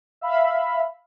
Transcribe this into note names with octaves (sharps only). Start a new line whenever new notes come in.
E5 F5 B5